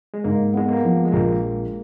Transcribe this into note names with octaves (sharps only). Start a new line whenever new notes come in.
G#3
G#2 A#3
G#3 B3
A#3
F3
G#3
A#1 A#3